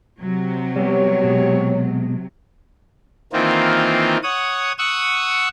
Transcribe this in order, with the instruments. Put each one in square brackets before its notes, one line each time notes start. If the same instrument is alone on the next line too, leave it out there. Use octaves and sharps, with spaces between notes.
[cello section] C3 F#3
[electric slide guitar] G3 B3 [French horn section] G4 C#5
[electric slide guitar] B2 G#3
[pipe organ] D#3 E3 A#3 C4 F4
C#5 F#5 D#6
F#5 C#6 D#6 E6